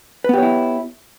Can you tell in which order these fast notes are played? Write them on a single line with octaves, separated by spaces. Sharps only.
B4 B3 G4 C#5 E4